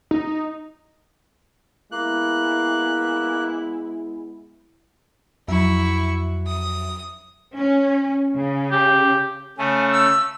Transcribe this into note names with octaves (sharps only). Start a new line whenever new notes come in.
D#4
G#3 A#3 B3 E4 F#6
F2 F#3 E4 E5 C#6
D#6
C#4
C#3
G4
C#3 A3 G#5
E6